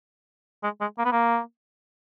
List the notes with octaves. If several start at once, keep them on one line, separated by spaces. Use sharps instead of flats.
G#3
G#3
A#3
B3
A#3